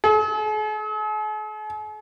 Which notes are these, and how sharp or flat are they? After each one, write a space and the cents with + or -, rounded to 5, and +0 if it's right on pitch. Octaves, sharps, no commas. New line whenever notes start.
G#4 +45